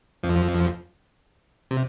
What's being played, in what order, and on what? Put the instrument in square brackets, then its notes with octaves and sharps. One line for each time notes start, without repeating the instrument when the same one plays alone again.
[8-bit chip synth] F2 F3
C3